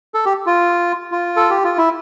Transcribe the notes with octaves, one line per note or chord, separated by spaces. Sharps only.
A4
G4
F4
F4
A4
G4
F4
E4